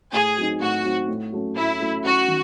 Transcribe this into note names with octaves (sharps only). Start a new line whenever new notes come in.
A2 G#4
F#3 C4 D#4
A2 F#4
F#3 C4 D#4
A2
F#3 A3 C#4
A2 E4
F#3 A3 C#4
F#2 F#4
D#3